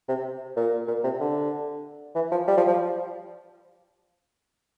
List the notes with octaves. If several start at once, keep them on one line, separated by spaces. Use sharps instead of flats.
C3
A#2
A#2
C3
D3
E3
F3
G3
F3
F3